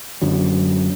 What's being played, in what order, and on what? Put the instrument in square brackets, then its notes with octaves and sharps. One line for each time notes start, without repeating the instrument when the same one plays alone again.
[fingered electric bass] F#2 D3 F#3